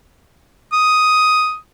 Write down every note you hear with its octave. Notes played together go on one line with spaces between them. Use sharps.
D#6